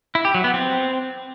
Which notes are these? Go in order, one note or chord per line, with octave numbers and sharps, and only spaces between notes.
E4
G4
F#3
B3
C4